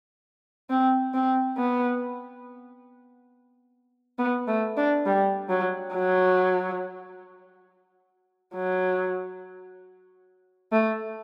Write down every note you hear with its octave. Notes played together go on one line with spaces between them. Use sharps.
C4
C4
B3
B3
A3
D4
G3
F#3
F#3
F#3
A3